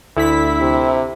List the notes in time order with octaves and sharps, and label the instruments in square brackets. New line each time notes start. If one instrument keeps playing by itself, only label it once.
[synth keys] D2 B6 [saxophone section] E4
[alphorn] C3